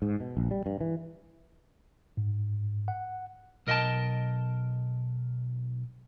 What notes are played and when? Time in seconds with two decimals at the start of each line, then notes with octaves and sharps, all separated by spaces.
0.02 G#2
0.20 B2
0.37 A#1
0.51 G3
0.66 G2
0.81 E3
2.17 G#2
2.88 F#5
3.67 B1 A#4 D#5 F#5 G5 A5